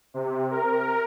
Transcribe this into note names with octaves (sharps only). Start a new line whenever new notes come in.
C3
A#4